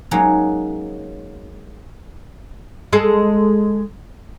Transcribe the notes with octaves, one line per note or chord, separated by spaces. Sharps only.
F#3 G#3 A#3 C#4 D#4
G#3 G#4 A4